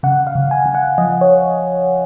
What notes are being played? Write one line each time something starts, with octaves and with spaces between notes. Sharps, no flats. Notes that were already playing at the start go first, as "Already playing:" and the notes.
C#3 F#5
F5
C#3
G#5
C#3
F#5
F3 D#5
C#5